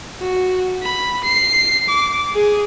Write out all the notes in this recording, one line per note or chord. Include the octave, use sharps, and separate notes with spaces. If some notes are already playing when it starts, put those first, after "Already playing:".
F#4
B5
C7
D6
G#4